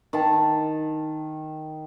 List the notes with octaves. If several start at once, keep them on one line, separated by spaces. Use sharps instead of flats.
D#3 A5